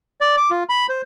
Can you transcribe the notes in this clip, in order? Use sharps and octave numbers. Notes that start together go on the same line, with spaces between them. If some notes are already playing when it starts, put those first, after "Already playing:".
D5
D6
F4
B5
C5